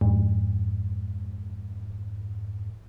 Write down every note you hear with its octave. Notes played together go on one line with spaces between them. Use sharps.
F2 G#2